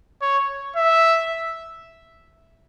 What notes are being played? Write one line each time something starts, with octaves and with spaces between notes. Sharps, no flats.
C#5
E5